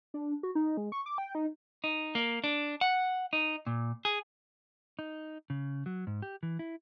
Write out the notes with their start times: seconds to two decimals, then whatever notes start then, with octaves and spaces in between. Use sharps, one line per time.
0.14 D4
0.43 F#4
0.55 D#4
0.77 G#3
0.92 C#6
1.06 D6
1.18 G5
1.35 D#4
1.84 D#4
2.15 A#3
2.44 D4
2.81 F#5
3.33 D#4
3.67 A#2
4.05 G#4
4.99 D#4
5.50 C#3
5.86 F#3
6.07 G#2
6.22 G4
6.43 E3
6.59 E4